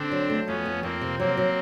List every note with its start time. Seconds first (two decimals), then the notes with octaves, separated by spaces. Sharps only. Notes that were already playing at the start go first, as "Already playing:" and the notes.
Already playing: D3 C4 D4
0.11 F#3
0.30 A3
0.47 F2 B3 C#4
0.66 F2
0.83 F2 A#3 C4
1.01 C3
1.19 F#3 A#3 C4
1.37 F#3